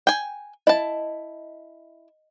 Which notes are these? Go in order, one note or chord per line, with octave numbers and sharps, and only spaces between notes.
G5 G#5
E4 D#5 A5